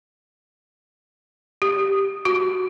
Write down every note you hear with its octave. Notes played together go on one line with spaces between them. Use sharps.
G4
F#4